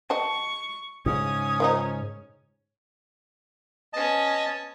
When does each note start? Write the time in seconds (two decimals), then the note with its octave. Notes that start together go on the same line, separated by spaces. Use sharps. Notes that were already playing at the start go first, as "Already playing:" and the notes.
0.10 D#5 G5 A5 C#6
1.06 G#2 C#3 C#4 D#6
1.60 D#3 F3 D#4
3.93 B3 C#4 D#5 A5